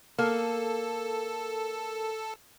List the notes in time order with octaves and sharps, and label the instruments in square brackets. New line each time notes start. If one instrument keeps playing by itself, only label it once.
[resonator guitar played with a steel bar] A#3 [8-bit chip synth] A4